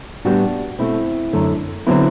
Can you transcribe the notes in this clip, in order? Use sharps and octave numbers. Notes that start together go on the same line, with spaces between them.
A2 G3 B3 D4 F#4
B2 A3 C4 E4
F#2 D3 A3
D3 F#3 B3 C4 E4